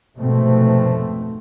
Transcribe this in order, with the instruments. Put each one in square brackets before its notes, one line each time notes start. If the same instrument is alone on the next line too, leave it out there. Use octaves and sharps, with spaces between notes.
[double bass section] F1 G#2 B2 A3 C4